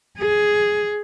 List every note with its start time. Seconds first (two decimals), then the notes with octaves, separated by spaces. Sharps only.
0.18 G#4